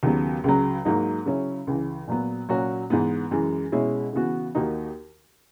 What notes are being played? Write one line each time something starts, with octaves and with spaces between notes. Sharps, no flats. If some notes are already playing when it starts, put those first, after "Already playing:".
D#2 C#3 F#3 B3
C#2 C#3 F#3
G#2 F#3 A#3 D#4
C#3 F#3 C#4 E4
C#2 C#3 E3
A#2 F#3 B3
A#2 F#3 C#4 F#4
G#2 E3 B3
F#2 E3 G#3
B2 G#3 C#4 E4
C#3 E3 B3 F#4
D#2 D#3 A#3 D#4 F#4